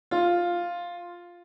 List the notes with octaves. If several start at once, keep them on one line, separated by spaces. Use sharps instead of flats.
F4